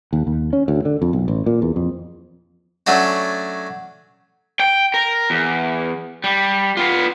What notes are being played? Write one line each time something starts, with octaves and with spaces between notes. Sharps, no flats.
D#2
D#2
C#4
D2
D3
F2
B1
A1
A#2
E2
F2
F#3 A3 C#4 D4 F#4
G5
A#4
E2
G3
B3 F4